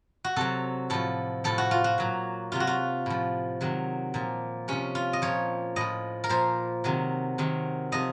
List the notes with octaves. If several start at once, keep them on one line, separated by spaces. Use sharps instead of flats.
F#4
C3 F#3 A4
A2 F3 A4
A2 F3 A4
F#4
F4
F#4
A#2 F#3
C3 F#3 F4
F#4
F4
A2 F3
C3 D#3 F#3
A#2 F3
C3 F3 C#4
F4
D#5
A#2 F3 C#5
A2 F3 D#5
A#4
A#2 F3 C5
C3 D#3 F#3
C3 D#3 F#3
C3 F3 D#5